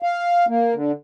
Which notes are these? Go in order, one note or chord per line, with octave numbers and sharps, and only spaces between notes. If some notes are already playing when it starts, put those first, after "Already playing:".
F5
A#3
D3